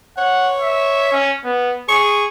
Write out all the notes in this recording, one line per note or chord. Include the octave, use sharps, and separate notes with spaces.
C#5 F#5
E5
C#4
B3
G#4 C#6